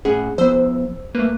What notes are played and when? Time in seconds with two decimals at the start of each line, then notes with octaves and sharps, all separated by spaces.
0.05 A2 C#4 G#4 F#5
0.38 F3 B3 C5 E6
1.15 A3 A#3 B4